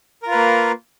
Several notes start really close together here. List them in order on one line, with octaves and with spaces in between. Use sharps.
A#4 F4 B4 A#3